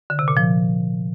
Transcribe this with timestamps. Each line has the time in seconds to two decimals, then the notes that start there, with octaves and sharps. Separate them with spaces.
0.10 D3
0.19 C3
0.28 A#2
0.37 F3